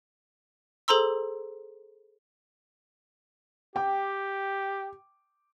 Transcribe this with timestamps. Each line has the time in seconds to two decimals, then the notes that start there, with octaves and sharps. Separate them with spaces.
0.88 G#4 A4 C5 A#5 C6 E6
3.76 G4 G5 D6